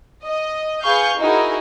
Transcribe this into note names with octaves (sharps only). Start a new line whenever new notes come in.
D#5
G#4 B4 F5 C#6 G6
D#4 E4 F#4 G#4 A#4